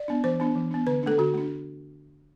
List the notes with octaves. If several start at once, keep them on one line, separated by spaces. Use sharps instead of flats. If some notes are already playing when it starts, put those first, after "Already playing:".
Already playing: D5
B3 D4
E3 C5
B3 D4
E3
B3 D4
D3 B4
A3 D4 A4
D3 F#4
A3 D4